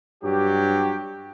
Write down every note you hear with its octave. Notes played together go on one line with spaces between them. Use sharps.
G2 F#3 G4